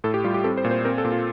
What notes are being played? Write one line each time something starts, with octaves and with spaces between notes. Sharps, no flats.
A2 A4
G4
G3 F4
G4
C4 A4
C5
A#2
C5
C4 A#4
A4
A#2
F4